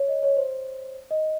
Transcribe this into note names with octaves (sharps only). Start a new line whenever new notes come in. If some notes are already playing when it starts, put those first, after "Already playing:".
Already playing: C#5
D#5
C#5
C5
D#5